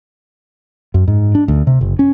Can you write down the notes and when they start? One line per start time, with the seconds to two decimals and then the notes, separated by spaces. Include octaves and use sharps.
0.94 F#2
1.08 G#2
1.35 D4
1.48 D2
1.67 C3
1.81 F#1
1.99 C#4